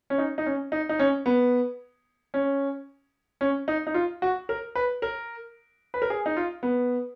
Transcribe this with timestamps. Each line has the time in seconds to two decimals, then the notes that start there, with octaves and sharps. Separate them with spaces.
0.10 C#4
0.18 D#4
0.38 D#4
0.46 C#4
0.72 D#4
0.89 D#4
0.99 C#4
1.26 B3
2.34 C#4
3.41 C#4
3.68 D#4
3.87 D#4
3.94 F4
4.22 F#4
4.49 A#4
4.75 B4
5.02 A#4
5.94 B4
6.02 A#4
6.10 G#4
6.26 D#4
6.37 F4
6.63 B3